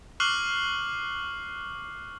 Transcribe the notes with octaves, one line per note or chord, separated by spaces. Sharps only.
C#6 D6 F6 F#6 C7 F#7